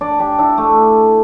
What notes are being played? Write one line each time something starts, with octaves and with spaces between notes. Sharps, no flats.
D4 D5
D4 G4
D4 E4
A3